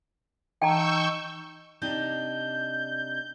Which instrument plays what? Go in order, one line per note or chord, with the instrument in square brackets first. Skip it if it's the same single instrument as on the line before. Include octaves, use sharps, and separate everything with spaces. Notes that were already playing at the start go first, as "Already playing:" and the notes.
[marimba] E3 [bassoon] D#4 [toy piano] G5 A5 A#5 [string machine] C#6 E6 G6
[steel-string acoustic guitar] C3 D4 D#4 [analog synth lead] G6